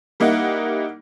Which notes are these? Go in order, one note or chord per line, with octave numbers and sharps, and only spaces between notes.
G3 A#3 D#4 E4 F#5